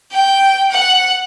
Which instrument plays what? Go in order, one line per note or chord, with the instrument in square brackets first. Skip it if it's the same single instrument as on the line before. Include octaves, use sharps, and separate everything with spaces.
[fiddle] G5
F#5